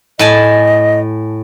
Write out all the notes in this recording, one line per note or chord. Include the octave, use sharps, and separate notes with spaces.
A2 D#5 G#5 A5